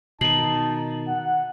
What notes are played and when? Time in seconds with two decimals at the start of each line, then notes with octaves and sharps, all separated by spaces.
0.21 B2 D#3 D#4 A5 C7 F#7
1.07 F#5